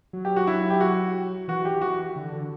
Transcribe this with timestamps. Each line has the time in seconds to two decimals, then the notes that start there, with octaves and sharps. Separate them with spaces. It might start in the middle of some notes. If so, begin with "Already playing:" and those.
0.13 F#3
0.25 G4
0.36 F#4
0.47 E4
0.70 G4
0.81 F#4
1.48 E3 F#4
1.65 G4
1.82 F#4
2.16 D3
2.33 D3